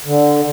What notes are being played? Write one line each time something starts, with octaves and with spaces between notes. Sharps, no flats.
D3